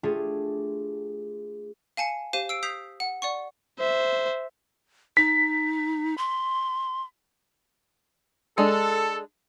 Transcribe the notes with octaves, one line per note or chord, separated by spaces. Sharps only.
A3 D4 F4 G4 G#4
F5 G#5 A5 C#7
G4 C5 F5 D#7
E6 C7 D7
D#6 G6 B6 C7 F7
F#5
D5 F#5 C#6
C5 E5
D#4 B6
C6
G#3 D4 A4